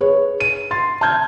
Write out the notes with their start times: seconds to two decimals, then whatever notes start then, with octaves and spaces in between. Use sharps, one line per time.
0.01 G#4 B4 C#5
0.40 D#7
0.71 C6 A6
1.01 A5 F6 G6 G#6